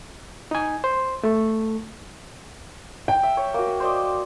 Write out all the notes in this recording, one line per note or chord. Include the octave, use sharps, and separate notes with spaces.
D#4 G#5
C5
A3 A4
G5
E5
C#5
A#3 F#4
C5 D5 D#5